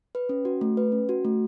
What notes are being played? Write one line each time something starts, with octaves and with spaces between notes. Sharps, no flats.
B4
C#4
F#4
A3
B4
C#4
F#4
A3